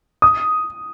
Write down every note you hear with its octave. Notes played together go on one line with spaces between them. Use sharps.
D#6